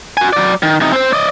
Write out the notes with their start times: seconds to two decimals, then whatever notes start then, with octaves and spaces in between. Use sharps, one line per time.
0.17 F#4 G#5
0.33 F#3 D5
0.63 D#3
0.81 C3 D#4
0.93 C4 C5
1.13 D5 D#5